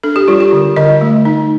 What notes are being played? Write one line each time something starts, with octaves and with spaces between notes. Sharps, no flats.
D4 A4
G4
G3 F4
G4
D3
D3 D#5
A3
D#4